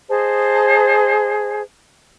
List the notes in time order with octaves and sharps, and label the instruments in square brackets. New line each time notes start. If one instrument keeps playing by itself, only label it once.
[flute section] G#4 C5 D#5 A5